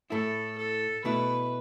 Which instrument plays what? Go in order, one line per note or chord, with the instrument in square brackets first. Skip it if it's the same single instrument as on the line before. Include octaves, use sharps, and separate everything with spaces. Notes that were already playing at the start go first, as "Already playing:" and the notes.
[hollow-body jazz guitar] A2 A3 E4 [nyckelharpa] A4
[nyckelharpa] A4
[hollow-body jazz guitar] B2 A3 E4 [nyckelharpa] B4